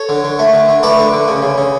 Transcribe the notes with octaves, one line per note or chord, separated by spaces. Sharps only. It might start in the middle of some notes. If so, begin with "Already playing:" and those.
Already playing: A4 C#5
D3
D3
A3
D3
D3
A3 B4 D5
D3
D3
C#3
C#3
C#3